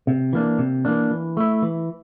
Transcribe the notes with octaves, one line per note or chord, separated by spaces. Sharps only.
C3
E3 A#3 D4
C3
E3 A#3 D4
E3
A3 E4
E3